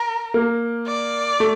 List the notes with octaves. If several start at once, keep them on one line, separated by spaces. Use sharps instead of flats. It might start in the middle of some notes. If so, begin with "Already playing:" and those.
Already playing: A#4
A#3
D5
A3